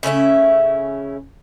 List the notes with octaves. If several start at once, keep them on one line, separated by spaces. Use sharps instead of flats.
C#3 A3 C#4 E4